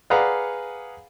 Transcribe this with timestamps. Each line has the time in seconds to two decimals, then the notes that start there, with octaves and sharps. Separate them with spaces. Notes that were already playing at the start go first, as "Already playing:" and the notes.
0.10 G#4 B4 D5 F5 F#5 A#5